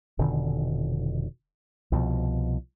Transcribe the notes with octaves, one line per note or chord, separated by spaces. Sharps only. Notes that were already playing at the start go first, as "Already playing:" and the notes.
F1 B2 D3 D#3
C2 B2 F3